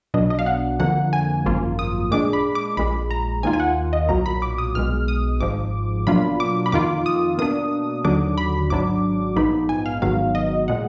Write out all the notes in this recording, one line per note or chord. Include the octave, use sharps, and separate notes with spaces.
B1 B2 F#3 D4 D#5
D#5
F5
F#5
F2 D3 F3 A#3 F#5
G#5
G#1 F#2 F3 A#3 F4
D#6
A#2 G#3 D4 D6
B5
D6
A#1 A#2 G#3 B5
A#5
D#2 D#3 A#3 F4 G#5
G#5
F#5
D#5
B1 A#2 F#3 A#3 A#5
B5
D6
D#6
B1 B2 G#3 F6
D#6
G#1 G#2 F3 D6
B2 F#3 A#3 D4 F4 B5
D6
B5
F2 D#3 A#3 F4 D6
D#6
B2 A#3 D4 D#6
D#2 D3 F#3 D4 D6
B5
G#1 G#2 F#3 D4 D6
A#1 G#2 F3 B3 D#4 B5
G#5
F5
G#1 G#2 D#3 F#3 B3 F5
D#5
A#2 G#3 F#5